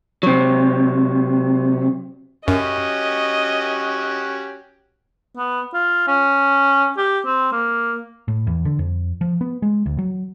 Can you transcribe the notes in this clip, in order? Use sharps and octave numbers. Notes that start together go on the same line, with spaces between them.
C3 F#3
F#2 C#4 F#4 G4 D#5
B3
F4
C#4
G4
C4
A#3
A2
E2
D3
F2
F3
B3
G#3
D2
F#3